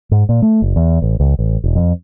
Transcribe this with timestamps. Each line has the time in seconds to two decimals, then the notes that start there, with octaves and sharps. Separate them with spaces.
0.11 G#2
0.29 A#2
0.42 A3
0.62 F#1
0.76 E2
1.02 A1
1.20 C#2
1.39 A1
1.64 E1
1.76 F2